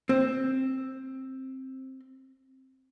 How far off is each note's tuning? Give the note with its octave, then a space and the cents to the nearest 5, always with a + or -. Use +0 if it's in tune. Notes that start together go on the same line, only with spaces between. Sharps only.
C4 +10